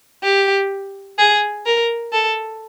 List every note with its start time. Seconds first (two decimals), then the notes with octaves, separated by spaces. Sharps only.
0.23 G4
1.18 G#4
1.66 A#4
2.13 A4